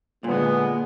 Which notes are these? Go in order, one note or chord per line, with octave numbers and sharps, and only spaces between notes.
A#2 D3 G#3 B3